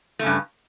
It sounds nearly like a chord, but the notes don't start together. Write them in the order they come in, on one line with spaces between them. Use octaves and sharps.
A3 C#3 G2